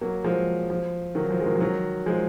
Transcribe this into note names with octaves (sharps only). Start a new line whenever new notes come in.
F#3 A#3
F3 G#3
F3
D#3 F#3
F3
G#3
D#3 F#3
F3
D#3 F#3
F3 G#3